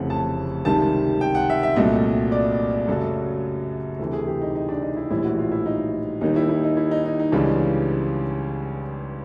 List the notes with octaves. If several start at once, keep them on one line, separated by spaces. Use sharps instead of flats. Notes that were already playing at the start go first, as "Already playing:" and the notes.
Already playing: F1 F2 C#3 E3 A3 F#5
A5
C#2 C3 D#3 G3 A5
G5
F#5
E5
E5
C2 A#2 F#3 A3 D#5
D5
F#2 C#3 F#3 A3 A4
D2 C3 E3 A4
G#4
G4
D#4
D#4
D4
D#4
E4
A#1 A2 E3 G3 E4
F#4
F4
E4
D#4
D#2 D#3 G3 D#4
E4
E4
D#4
E4
D#4
D#4
D#4
C#2 C#3 E3 G3 D4